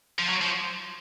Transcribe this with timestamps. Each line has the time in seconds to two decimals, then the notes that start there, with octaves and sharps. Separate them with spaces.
0.19 F3
0.29 F#3
0.41 F3